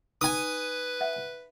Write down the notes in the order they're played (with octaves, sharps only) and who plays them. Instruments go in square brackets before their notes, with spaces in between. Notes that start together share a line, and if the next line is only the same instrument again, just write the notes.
[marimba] D#4 [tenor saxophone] B4 [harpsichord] G#5 D#6
[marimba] E5 F#5